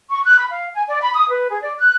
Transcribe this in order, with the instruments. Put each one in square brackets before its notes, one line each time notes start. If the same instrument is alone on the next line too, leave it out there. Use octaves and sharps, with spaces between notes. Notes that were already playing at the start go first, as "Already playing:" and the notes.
[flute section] C#6
F#6
B5
F5
G#5
D5
B5
D#6
B4
G#4
D5
F#6